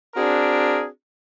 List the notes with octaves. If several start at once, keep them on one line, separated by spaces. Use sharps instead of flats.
C4 D4 F#4 G#4 A#4